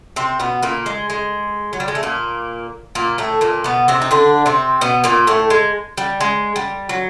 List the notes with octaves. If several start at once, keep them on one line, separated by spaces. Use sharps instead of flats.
C3 C4
B2 B3
A#2 A#3
G#3
G#3
F#3
G3
G#3
A3
A#2 A#3
A#2 A#3
A2 A3
A#2 A#3
B2 B3
C3 C4
D#4
D3 D4
C3 C4
B2 B3
A#2 A#3
A2 A3
G#3
G3
G#3
G3
F#3